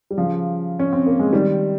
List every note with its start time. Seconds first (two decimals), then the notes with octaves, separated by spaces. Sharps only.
0.11 G3
0.17 C#3 F3
0.79 C#4
0.92 C4
1.06 A#3
1.19 G#3
1.33 D#3 G3